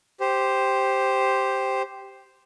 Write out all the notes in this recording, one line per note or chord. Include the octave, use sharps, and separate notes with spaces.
G4 C5